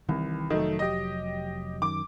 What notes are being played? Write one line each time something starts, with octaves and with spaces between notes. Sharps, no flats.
C2 D#3 E3
F1 D#3 F#3 A3
G4 D#5
F#2 D#3 D6